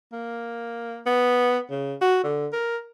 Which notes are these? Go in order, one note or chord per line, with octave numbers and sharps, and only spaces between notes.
A#3
B3
C#3
F#4
D3
A#4